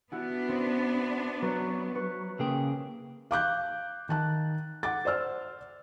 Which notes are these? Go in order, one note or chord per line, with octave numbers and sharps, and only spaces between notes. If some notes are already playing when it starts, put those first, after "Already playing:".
B3 D4 E4 F#4
C4
F#3 B4 C#5
B4 C#6
C#3 A#3 G#4 G5
F5 D6 F#6 G6
D#3 A5 F#6
F#5 D6 A6
C5 D5 E6 F6